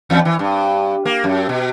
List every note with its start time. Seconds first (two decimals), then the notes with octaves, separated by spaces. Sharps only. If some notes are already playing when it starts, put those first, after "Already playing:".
0.10 E2
0.25 E3
0.39 G2
1.05 A#3
1.24 F#2
1.49 B2